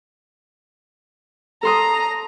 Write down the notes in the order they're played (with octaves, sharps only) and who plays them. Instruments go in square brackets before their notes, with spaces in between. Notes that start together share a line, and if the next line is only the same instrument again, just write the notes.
[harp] A4 C6 D#6 [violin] A#5